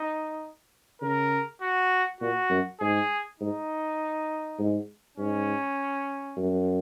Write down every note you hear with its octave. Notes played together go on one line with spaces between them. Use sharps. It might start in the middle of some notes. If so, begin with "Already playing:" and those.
Already playing: D#4
C#3 A#4
F#4
A#2 F#4
F#2
G#2 G#4
G#2 D#4
G#2
G#2 C#4
F#2